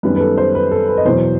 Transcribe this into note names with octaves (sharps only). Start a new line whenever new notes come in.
F#2 D#3 G3 B3 B4
B4
A4
C5
B4
A4
B4
D#5
E2 B2 F#3 C5